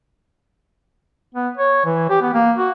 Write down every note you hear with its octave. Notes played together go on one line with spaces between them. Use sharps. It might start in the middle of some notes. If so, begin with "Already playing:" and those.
B3
C#5
E3
G4
B3
A#3
F#4